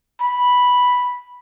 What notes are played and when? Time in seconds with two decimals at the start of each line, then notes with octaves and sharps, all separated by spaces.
0.21 B5